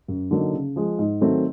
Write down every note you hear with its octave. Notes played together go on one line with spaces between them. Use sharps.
F#2
D3 F#3 A#3 D#4
C#3
F3 G#3
G#2
D#3 F#3 A3 C4